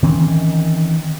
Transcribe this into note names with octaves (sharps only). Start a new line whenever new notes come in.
D#3 E3 C4 C#4